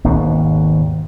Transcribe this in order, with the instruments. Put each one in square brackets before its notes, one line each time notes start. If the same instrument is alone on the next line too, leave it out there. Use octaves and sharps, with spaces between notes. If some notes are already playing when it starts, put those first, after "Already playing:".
[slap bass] G#1 D#2 G#2 B2